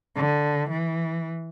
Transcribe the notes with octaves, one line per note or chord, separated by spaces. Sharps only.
D3
E3